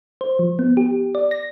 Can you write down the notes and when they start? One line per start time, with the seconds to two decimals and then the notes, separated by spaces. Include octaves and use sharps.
0.21 C5
0.39 F3
0.59 B3
0.77 G4
1.15 D5
1.31 A#6